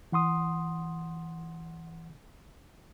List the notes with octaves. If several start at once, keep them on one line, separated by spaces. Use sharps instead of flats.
E3 F#5 C6 D#6